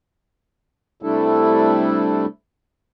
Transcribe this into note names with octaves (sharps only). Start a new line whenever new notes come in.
C3 G3 A3 D4 E4 A4